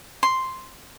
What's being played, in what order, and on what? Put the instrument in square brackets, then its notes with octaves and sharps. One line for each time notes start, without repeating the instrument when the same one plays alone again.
[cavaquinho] C6